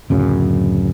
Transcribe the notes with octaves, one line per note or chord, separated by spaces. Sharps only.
D1 F#2 C#3